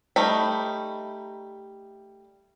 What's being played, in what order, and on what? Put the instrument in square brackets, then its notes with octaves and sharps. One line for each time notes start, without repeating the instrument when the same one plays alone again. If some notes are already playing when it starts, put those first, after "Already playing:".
[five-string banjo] G3 A3 D#4 B5